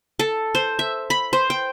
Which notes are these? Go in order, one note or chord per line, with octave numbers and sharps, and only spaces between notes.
A4
C5
E5
B5
C5
G5